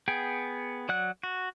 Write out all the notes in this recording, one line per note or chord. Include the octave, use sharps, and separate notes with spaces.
B3 G#4 G5
F#3 D5 F#5 F#6
F#4